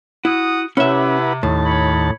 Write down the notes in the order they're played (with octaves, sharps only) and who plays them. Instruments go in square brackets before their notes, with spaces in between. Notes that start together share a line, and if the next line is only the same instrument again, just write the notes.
[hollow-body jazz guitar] E4 [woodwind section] F#4 F#5 D#6
[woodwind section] C3 [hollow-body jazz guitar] C#4 E5 [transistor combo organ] E4 B4 F#5
[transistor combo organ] D#2 A5 [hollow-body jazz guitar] A2
[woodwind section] C#5 B5